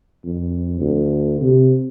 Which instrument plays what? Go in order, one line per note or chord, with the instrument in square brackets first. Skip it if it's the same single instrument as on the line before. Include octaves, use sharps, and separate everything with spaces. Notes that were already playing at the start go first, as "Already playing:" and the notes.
[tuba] F2
D2
C3